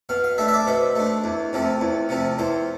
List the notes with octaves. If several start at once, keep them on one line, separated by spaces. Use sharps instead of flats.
B2 F5
F5
A3 D4 E5
E5
D5
B2 C5
A3 D4
E2
C3 F3 A3
E2
C3 F3 A3
E2 C5